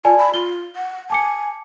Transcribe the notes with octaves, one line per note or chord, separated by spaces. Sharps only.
F4 D5 G#5 A5
B5
F4 G7
F#5
G#5 A5 D6 C#7